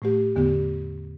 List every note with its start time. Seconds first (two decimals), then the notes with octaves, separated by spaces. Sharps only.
0.02 A2 A3 G4
0.36 E2 D3 B3 G4